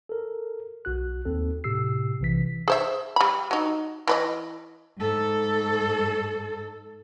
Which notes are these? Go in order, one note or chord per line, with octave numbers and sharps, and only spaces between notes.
A4 A#4
B1 F#4 F#6
D#2 C4 A4
A2 C3 G4 E6 C7
B1 C3 E3 B6
G#4 C5 E5
G3 B5
F#3 D#4
E3 B4 D#5
G#2 A4